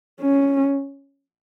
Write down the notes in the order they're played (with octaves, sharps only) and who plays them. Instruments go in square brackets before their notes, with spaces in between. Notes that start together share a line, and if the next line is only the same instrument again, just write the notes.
[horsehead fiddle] C#4